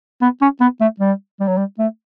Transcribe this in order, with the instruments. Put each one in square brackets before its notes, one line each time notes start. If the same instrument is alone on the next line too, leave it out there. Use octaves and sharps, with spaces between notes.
[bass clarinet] B3
C#4
B3
A3
G3
G3
F#3
G3
A3